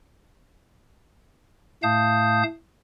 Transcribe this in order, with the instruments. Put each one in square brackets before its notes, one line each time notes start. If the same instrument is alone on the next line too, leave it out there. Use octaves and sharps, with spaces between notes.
[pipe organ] A2 A3 F5 A5 D#6 G6